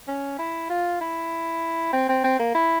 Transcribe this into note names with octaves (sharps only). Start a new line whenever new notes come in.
C#4
E4
F4
E4
C4
C4
C4
A#3
E4